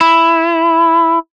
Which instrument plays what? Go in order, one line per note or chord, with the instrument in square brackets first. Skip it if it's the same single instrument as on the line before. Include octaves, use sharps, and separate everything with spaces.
[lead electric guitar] E4